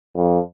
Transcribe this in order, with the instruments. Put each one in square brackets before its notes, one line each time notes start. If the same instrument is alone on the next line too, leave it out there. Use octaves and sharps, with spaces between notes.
[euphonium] F2